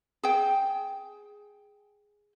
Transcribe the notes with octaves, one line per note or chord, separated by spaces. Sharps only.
G#4 G5